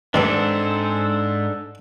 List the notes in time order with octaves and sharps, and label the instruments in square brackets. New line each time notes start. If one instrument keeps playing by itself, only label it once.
[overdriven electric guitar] G#2 [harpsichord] D#3 G3 B3 [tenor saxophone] C4 [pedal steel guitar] D4 A4